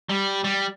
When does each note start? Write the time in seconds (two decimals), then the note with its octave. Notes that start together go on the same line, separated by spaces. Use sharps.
0.10 G3
0.44 G3